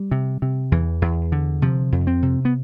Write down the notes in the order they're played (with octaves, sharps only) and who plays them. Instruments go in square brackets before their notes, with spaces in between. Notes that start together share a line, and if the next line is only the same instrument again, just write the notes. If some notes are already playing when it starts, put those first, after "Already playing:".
Already playing: [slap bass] G3
C3
C3
E2 E3
E2
D3
C3 F3
F2
C4
C3
B3